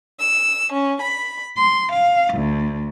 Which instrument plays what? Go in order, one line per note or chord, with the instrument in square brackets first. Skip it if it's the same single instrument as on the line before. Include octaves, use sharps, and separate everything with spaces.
[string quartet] E6
C#4
B5
C6
F5
D2